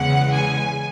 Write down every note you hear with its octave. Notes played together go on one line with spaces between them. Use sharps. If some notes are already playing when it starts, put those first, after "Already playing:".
Already playing: E2 C#3 E3 G#3 F#5
G#5